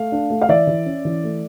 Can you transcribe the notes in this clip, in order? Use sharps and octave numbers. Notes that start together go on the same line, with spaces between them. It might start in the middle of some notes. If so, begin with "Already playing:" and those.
Already playing: A3 F5
D4
A3
F5
E3 D5 E5
E3
C#4
E3
A3